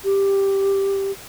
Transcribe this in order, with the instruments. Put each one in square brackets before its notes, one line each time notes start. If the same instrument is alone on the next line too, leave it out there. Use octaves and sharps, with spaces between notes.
[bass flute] G4